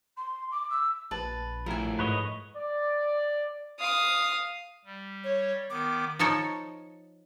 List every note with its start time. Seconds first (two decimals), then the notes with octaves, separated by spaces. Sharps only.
0.17 C6
0.51 D6
0.70 E6
1.11 A#1 B4 A5
1.66 F3 A3 E4 A#4 G#5
1.99 G#2 B4 C#5 D#5
2.56 D5
3.80 F5 D#6
4.85 G3
5.24 C#5
5.70 D#3 B3 D6
6.19 F3 D#4 A4 C#5